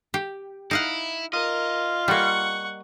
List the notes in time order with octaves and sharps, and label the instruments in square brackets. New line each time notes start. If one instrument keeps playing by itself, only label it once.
[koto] G4
[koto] D#4 F5 F#5 [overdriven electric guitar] E4
[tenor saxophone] F4 [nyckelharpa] A#4 [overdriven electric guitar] D#5
[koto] G3 A#3 [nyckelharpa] F#5 C#6